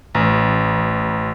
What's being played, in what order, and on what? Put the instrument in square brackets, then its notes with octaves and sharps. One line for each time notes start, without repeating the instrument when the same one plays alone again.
[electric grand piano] A1